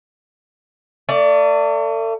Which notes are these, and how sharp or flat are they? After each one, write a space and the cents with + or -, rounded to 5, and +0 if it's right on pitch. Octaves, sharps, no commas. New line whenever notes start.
A3 +40 D5 +0